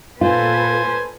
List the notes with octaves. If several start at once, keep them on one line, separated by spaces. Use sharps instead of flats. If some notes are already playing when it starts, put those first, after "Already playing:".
A#2 F4 A4 B4 C5 G#5